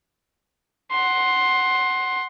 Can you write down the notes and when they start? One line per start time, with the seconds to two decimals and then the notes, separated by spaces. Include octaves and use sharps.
0.91 F#5 C6